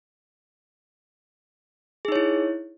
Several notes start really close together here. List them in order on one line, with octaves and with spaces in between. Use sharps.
G#4 D#4 C#5 E4